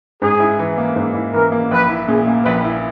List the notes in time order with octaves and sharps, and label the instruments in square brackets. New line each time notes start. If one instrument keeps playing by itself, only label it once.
[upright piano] G#2 [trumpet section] G#4
[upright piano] E4
E3
A#3
G#2
E4
[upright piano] E3 [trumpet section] A#4
[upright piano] A#3
[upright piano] A#1 [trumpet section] B4
[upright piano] E4
[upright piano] A#2 [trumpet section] G#4
[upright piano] A#3
[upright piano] A#1 [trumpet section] B4
[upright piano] E4